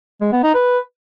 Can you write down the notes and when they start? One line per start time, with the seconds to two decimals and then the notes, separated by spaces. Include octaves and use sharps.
0.21 G#3
0.32 B3
0.43 D#4
0.54 B4